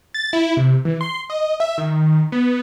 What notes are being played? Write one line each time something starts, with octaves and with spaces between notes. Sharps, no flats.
A6
E4
C3
E3
C6
D#5
E5
D#3
B3